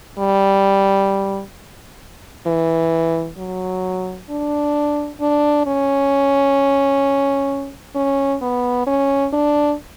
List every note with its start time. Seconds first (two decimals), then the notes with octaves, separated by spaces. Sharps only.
0.19 G3
2.46 E3
3.38 F#3
4.30 D4
5.21 D4
5.66 C#4
7.95 C#4
8.42 B3
8.87 C#4
9.33 D4